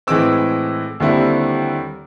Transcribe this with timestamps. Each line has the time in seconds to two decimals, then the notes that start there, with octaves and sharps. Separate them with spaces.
0.07 A2 E3 G#3 C4 D6 E6
1.00 D#2 D3 G3 C4 E4